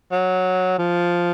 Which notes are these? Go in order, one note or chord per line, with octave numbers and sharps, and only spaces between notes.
F#3
F3